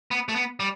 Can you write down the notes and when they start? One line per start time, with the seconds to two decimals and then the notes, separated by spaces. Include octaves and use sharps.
0.11 B3
0.29 A3
0.35 B3
0.60 G3